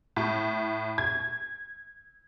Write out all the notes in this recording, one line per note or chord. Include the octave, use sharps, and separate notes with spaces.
A2
G#6